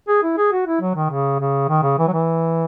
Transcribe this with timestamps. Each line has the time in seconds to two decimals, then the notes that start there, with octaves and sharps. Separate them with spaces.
0.08 G#4
0.23 E4
0.37 G#4
0.52 F#4
0.66 E4
0.81 F#3
0.95 D#3
1.10 C#3
1.40 C#3
1.69 D#3
1.83 C#3
1.98 E3
2.07 F#3
2.13 E3